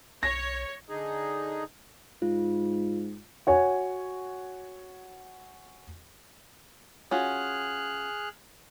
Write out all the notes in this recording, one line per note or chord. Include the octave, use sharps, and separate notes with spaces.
B1 C#5 A#6
D3 D#4 G#4
G#2 F4
F#4 C#5 G#5
C#4 F4 F#4 G#4 F6 F#6